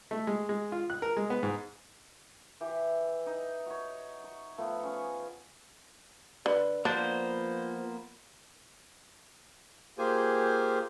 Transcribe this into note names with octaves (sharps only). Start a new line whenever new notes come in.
A3
G#3
G#3
F4
F#6
A#4
G#3
B3
G#2
E3 G4 E5
D#4
F#4 C#5
C#6
F3 A3 B3
C#4 G#4 C#6
D3 B4
F3 A#3 B3 D4 C5
A#3 F4 G4 G#4 C5 G#5